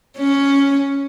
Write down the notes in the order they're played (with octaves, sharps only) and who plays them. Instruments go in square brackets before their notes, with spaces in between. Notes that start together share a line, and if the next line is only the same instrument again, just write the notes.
[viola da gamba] C#4